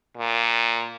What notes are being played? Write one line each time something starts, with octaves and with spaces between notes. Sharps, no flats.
A#2